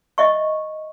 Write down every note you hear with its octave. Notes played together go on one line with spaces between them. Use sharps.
D#5 E5 C#6